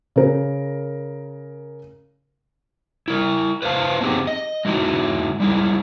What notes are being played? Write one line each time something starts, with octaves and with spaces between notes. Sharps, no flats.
C#3 A#4
E4 A#4
B4 C5 E5 F5 A5
B3 C4 D#4 G4 G#4
D#5
G#3 D#4 E4 F#4
G3 G#3 E4